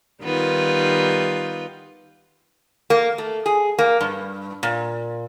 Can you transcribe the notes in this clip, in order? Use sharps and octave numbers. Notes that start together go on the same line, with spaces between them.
D#3 G3 B3 F4
A#3
A3
G#4
A#3
G2
A#2